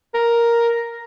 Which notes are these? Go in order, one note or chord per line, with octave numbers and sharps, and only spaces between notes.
A#4